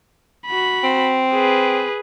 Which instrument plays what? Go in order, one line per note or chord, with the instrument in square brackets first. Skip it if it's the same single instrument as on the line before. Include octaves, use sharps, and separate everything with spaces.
[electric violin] F#4 B5
[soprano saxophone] C4
[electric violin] G#4 B4